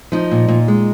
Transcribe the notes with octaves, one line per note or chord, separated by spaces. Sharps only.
F3 D#4
A#2
A#2
G#3